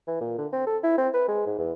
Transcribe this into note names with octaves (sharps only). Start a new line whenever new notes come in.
E3
A#2
D3
C4
A4
E4
C4
B4
G#3
G#2
E2